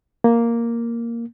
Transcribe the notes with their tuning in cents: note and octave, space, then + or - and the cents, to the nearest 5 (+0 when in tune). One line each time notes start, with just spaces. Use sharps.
A#3 +0